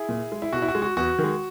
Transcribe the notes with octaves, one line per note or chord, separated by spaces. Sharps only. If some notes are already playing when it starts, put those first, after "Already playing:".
Already playing: E4 G#4
A#2
G#3
E4
B2 F#4
E4
F#4
G#3
F#4
E2 F#4
D#3 G#3